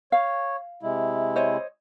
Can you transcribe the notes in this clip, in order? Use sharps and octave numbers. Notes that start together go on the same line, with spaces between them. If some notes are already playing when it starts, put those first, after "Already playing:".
C#5 F5
C3 G#3 E4
C5 C#5 D#5